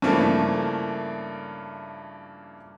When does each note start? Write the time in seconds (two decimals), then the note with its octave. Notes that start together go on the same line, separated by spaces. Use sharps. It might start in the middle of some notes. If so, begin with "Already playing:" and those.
0.02 G2 C#3 E3 F3 A3 A#3